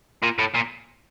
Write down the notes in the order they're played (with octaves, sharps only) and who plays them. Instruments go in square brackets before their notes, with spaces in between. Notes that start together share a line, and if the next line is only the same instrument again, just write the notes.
[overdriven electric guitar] A#2
A2
A#2